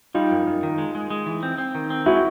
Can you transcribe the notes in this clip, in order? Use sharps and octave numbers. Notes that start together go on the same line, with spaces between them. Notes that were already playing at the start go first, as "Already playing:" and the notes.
G3 D#4 F4
F#2
F#2
D#3
G#3
G#3
G#3
E3
C4
C4
D#3
C4
G#3 E4 F#4